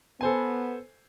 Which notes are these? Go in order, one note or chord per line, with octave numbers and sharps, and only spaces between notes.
B3 A4 C5 G#5